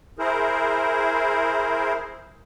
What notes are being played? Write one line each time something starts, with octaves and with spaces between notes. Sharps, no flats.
E4 G#4 A#4 C5